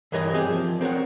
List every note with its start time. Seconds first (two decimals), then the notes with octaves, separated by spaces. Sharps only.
0.12 G2 E3 A#4 C#5 D#5
0.33 C4 G4 G#4
0.46 F3
0.81 C4 A#4 C#5 F#5